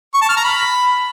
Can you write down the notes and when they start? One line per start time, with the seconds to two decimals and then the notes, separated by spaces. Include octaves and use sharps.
0.14 C#6
0.22 A5
0.29 F6
0.37 A#5
0.44 B5